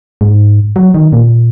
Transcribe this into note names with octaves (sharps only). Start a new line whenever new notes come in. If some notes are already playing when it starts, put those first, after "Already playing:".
G#2
F#3
D#3
A#2